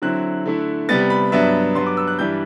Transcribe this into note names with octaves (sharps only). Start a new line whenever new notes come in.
D3 F#3 C4 E4 F#6
D3 A3 E4
C3 G3 B3 A6
B5
G2 F#3 B3 D4 E5
G2 F#3 B3 C6
D6
E6
F#6
G2 E3 G3 D4 G6